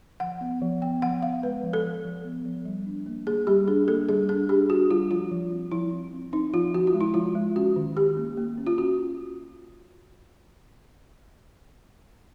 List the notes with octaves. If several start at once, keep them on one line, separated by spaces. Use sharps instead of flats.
F3 F#5
B3
F3
B3 G5
F3 F#5
B3 F5
G#3 B4
F3
A4
F3
F3
B3
F3
G3
D4
A#3
A#3 G#4
G3 G4
D4 G#4
A#3 A4
G3 G#4
D4 G#4
D4 G4
D4 F#4
G3 F4
F3 F4
F3
C4
F3 E4
C4
C4
C4 D#4
F3 F4
F3 F#4
F4
G#3
E4
F3 F4
G#3
C#4 F#4
D#3
C#4 G4
A#3
A#3
C#4
F4
C#4 F#4